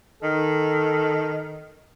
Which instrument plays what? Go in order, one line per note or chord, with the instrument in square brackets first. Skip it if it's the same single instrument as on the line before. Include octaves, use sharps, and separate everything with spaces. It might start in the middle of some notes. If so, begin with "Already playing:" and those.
[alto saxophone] D#3 [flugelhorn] A4